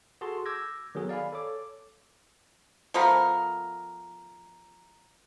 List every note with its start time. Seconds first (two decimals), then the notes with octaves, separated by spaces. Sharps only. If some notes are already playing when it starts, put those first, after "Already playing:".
0.21 F#4 G#4 A4 A5 C6
0.46 D6 E6 G6 G#6 A#6
0.95 D#3 F#3 B3 G#4 A4
1.09 D5 F5 G#5 B5
1.33 A4 C#5 D6
2.94 F3 A3 B3 A#4